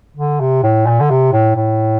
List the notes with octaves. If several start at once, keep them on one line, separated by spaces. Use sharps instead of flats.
D3
C3
A2
A#2
D3
C3
A2
A2